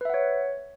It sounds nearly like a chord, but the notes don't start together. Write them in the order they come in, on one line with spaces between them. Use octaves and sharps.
B4 E5 F#5 C#5